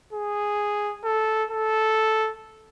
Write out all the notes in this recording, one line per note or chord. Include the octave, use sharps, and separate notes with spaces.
G#4
A4
A4